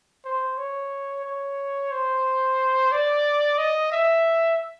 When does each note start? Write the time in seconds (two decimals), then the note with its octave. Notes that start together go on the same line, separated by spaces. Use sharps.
0.25 C5
0.57 C#5
1.25 C#5
1.91 C5
2.92 D5
3.58 D#5
3.92 E5